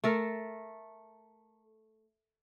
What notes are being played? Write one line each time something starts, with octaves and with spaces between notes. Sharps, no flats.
A3 A4 A#4